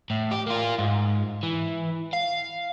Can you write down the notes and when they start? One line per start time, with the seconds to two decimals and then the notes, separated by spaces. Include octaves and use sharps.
0.10 A2
0.32 G4
0.47 A#3 F4
0.78 G#2
1.43 E3
2.13 F5